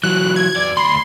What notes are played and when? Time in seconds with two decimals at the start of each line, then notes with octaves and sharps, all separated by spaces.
0.04 E3 F#3 F#6
0.36 G#6
0.56 F2 D5
0.77 D2 B5 C6